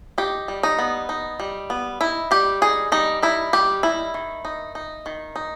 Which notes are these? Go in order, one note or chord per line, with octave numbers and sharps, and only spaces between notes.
D#4 G4
G3
D#4
B3
D#4
G3
B3
D#4 E4
G3 G4
D#4 G#4
G3 D#4
D#4 E4
G3 G4
D#4 E4
D#3
D#4
D#4
D#3
D#4